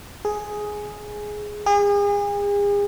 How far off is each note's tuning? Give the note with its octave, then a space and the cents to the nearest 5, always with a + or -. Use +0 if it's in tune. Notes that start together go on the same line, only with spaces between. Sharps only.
G#4 +5
G#4 -40